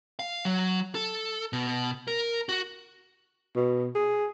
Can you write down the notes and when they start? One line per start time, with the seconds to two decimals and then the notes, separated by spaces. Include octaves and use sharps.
0.19 F5
0.45 F#3
0.95 A4
1.53 B2
2.08 A#4
2.49 F#4
3.55 B2
3.95 G#4